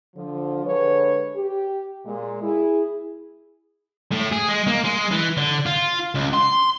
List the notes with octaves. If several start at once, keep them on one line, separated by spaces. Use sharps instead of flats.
D3 F3
D3 G#3 B4 C#5
G4
A#2 G#3
E4 G#4
A2
G#4
G#3
A#3
G#3
E3
D3
F4
C#2
C6